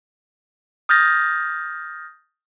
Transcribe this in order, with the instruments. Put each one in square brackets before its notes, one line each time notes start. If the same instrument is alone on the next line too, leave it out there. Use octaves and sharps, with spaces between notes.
[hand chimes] D#6 F6 G6 A6 A#6